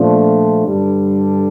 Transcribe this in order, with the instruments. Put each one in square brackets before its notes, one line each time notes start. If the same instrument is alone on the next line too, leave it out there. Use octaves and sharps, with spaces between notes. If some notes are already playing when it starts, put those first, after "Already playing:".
Already playing: [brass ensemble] A#2 F3 A3 D4
G2 D3 G3 D4